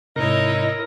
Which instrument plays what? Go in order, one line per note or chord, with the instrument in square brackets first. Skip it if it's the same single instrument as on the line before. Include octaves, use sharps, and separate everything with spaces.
[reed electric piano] G#2 C3 [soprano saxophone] D#4 [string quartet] E4 C#5 D#5 [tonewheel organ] A#4